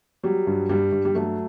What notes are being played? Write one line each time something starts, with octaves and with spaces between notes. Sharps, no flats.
F#3 G3
G2
G2 G3
G2
G3
F#3 A3